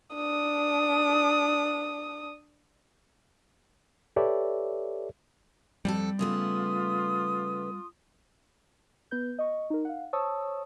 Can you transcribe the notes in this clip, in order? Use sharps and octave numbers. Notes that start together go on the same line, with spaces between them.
D4 D#6
G4 A4 B4 C#5 D5 E5
F2 G3 F4 A4
C#3 A3 B3 F4 C6 D#6
B3 B4 G6
D#5 C#6
D#4 A#4
F5 F#5
C5 C#5 A5 C#6 D#6 E6